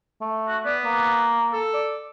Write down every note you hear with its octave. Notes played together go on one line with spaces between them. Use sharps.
A3
F#4
B3 D5
A#3
A4
D5